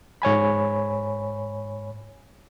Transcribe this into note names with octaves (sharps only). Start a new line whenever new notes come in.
G#2 C#5 G#5 B5